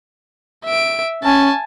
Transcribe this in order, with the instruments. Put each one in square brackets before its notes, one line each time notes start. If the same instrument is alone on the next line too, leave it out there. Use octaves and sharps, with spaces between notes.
[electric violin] E5 D7
[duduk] C#4 [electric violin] G#5 A5